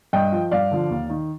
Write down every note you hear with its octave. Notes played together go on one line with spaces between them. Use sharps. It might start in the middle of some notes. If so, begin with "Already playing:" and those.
G2 D#5 G5
F3
G2 D5 F5
D3 F3
D#2
D#3